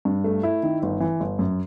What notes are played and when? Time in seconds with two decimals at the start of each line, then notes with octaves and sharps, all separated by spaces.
0.05 G2
0.24 A3
0.43 E4
0.63 D#3
0.83 G1
1.00 E3
1.20 G1
1.39 F#2